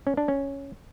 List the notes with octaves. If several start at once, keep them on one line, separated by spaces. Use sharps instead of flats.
C#4
D4
C#4